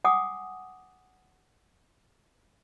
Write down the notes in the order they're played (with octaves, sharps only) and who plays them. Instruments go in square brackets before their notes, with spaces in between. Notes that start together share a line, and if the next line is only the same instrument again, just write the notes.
[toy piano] F#5 G#5 D6 D#6